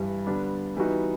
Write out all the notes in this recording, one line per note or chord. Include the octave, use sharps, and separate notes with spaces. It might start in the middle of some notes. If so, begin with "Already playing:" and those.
Already playing: G2 E3 G3
D3 G3 B3 D4
E3 G3 B3 D#4 F#4